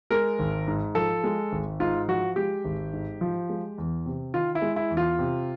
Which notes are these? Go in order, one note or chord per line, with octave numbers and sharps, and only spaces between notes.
G#3 A#4
G#1
G#2
F3 A4
G#3
G#1
G#2 F4
F3 F#4
G#3 G4
G#1
G#2
F3
G#3
E2
C3
D#3 F4
E4
G#3
E4
E2
F4
C3